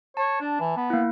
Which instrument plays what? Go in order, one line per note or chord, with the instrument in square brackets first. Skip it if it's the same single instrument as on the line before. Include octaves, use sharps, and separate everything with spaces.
[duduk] C#5 [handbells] A5
[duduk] D4
E3
B3
[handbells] A#3 E4